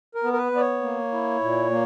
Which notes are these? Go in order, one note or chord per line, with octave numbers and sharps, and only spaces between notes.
A#4
B3
A#4
B4
B3 D5
C#5
A#3
E4
A#2
A#3